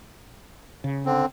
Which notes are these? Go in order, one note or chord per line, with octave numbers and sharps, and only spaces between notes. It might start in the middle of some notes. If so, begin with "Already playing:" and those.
C#3
D3 C4